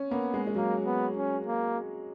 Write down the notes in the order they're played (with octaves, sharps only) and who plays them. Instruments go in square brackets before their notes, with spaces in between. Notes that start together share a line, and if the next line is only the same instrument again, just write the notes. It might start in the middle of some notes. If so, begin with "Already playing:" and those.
Already playing: [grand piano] C#4
[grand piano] A#3 [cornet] B3
[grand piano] G#3
G#3
[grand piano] F#3 [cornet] A#3
[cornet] B3
C#4
A#3